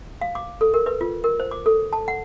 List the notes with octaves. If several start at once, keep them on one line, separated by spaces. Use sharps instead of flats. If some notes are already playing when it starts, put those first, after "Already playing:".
F5
D6
A4
A#4
B4
F4
A#4
C5
D6
A4
A5
F#5